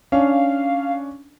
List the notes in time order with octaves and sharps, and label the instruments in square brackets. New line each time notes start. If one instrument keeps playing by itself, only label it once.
[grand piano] C#4 D4 [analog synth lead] F5